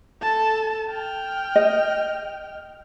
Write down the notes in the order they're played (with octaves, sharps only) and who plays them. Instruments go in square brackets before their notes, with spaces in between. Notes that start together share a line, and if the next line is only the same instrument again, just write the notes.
[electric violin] A4 A5
G5 F6
[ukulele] D#5